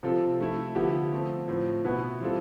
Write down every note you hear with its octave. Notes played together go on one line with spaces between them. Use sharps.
C3 F3 C4 F4 A4
F3 A3 E4
D3 F3 B3 E4 G4
F3 A3 C4
A2 F3 C4
B2 B3 E4 B4
E3 G3 C4 F4 A4